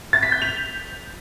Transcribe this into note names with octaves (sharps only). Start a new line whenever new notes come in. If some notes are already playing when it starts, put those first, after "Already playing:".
A6
B6
G6
F7